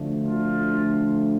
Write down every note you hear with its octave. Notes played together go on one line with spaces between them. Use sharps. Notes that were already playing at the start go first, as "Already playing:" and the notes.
Already playing: D2 D3 F3 A3
F4